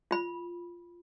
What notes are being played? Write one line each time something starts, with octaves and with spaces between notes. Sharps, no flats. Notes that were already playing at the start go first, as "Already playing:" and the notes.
F4 B5